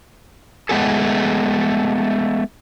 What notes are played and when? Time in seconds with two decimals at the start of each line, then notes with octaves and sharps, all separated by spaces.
0.69 G#3 A3 B3 G#4 A4